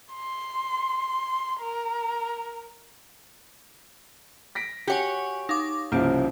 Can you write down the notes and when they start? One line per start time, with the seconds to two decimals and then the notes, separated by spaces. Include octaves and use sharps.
0.13 C6
1.61 A#4
4.55 A#6 B6 D7
4.87 F#4 G4 C#5 F#5 G#5
5.49 D#4 F5 D6
5.92 C2 C#3 F3 A#3 G4